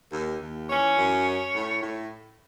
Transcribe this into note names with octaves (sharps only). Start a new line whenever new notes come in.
D#2
D#2
E3 C#4 C#5
F#2
C#4
A2
A2